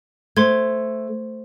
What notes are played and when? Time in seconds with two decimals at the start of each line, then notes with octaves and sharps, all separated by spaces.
0.37 A3 C5 C6 G#6